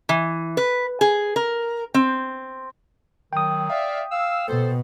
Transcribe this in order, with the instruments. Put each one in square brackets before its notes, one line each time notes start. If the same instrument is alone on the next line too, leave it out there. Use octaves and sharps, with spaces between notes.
[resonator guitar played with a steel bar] E3
B4
G#4
A#4
C4
[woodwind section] D#3 F#3 [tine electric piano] G5 D#6
[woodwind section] D5 E5 F5
F5 E6
[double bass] B2 [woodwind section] A4 C5